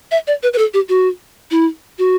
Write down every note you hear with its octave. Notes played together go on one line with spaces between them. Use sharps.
E5
D5
B4
B4
A4
G4
F#4
E4
F#4